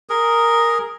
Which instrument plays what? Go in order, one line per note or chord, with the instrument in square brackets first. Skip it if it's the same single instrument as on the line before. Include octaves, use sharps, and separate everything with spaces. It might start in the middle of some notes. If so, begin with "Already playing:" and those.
[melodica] G#4 A#4